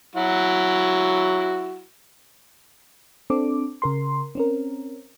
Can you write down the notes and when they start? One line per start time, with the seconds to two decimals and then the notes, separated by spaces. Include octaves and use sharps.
0.16 F#3 E4 F#4
3.30 C4 D4 A4 D6
3.82 C#3 A#4 C6
4.35 C4 C#4 A#4